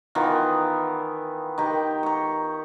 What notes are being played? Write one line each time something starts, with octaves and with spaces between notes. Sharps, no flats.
D#3 E3 B3 F4
D#3 G4
A#5 C#6